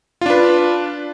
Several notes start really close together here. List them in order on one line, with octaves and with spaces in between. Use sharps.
F4 D4 B4